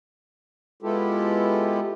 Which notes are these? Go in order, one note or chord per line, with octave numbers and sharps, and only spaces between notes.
G#3 B3 E4 F4 G4 A4